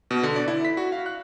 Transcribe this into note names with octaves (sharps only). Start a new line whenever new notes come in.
B2
D3
D5
E4
B6
F#4
F5
F#6